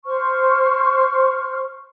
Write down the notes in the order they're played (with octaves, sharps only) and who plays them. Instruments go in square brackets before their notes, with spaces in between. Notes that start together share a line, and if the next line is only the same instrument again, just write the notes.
[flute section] C5 C#6 F6